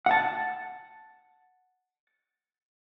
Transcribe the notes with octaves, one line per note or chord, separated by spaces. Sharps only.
F#5 A5